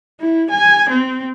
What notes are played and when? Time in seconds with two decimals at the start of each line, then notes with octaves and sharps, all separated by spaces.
0.21 E4
0.50 G#5
0.90 C4